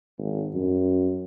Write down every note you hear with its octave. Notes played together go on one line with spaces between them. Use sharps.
G#1
F#2